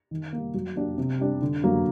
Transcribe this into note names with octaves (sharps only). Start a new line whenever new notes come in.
D#3
G3 A#3
F#3
A#3 D4 G4
C3
G3 D4 G4
D3
F#3 A#3